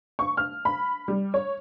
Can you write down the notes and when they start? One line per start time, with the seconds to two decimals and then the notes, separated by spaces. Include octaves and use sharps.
0.19 C#6
0.37 F6
0.65 B5
1.08 G3
1.34 C#5